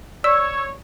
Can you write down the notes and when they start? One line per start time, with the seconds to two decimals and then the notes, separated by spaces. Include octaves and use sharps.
0.24 C#5 D5 E6